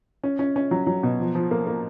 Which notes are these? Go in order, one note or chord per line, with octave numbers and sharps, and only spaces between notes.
C#4
C#4
C#4
F#3
F#3
B2
F3
F3
A#3
A#3